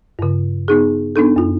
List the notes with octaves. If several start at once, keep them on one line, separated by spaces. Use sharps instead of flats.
G2 C#3
B3 D#4 G#4
B3 D4 D#4 A4
F#2 F4